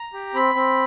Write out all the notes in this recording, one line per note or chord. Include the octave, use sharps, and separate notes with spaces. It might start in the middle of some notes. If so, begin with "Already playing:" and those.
Already playing: A#5
G4
C4 B5
C4